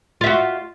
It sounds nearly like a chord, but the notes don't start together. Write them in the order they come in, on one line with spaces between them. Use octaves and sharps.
F4 E5 F#4